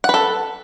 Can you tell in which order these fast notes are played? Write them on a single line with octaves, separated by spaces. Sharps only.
F#5 B4 A4